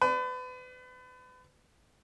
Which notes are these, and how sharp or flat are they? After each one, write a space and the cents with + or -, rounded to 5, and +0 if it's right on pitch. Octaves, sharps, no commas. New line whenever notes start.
B4 +35 D5 +0